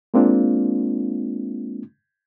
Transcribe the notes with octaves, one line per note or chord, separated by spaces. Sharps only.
G#3 A#3 C4 D4 F4